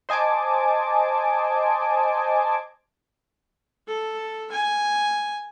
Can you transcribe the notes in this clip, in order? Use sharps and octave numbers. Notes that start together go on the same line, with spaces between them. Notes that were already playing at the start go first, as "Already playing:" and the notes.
C5 D#5 G#5 A5 D6
A4
G#5